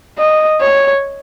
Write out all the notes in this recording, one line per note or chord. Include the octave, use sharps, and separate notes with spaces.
D#5
C#5